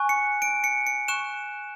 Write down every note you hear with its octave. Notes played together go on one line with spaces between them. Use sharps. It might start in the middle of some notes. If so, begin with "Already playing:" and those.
Already playing: G#5 C#6 F#6
C#7
D7
C#7
C#7
C#6 F#6 E7